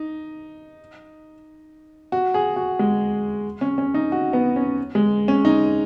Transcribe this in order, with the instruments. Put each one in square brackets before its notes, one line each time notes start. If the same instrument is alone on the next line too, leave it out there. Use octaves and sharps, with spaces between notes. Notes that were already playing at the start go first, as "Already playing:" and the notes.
Already playing: [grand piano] D#4
F#4
G#4
F#4
G#3
C#4
C#4
D#4
F#4
B3
C#4
G#3
C#4
D#4